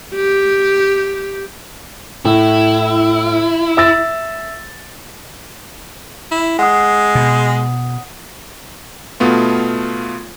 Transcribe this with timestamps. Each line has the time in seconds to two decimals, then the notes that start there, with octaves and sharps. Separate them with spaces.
0.15 G4
2.25 A2 E4
3.77 E5 E6 A6
6.32 E4
6.59 G#3 F#5 D#6
7.15 B2
9.20 B2 A3 B3 F4